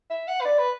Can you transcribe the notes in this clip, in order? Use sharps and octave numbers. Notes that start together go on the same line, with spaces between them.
E5
F#5
B4
D5
B4